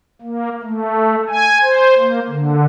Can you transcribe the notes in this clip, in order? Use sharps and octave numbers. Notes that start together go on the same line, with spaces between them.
A#3
A3
G#5
C5
A#3
D3